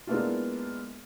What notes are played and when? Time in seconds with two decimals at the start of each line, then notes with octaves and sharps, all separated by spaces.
0.07 G#3 A#3 B3 D4 E4 F4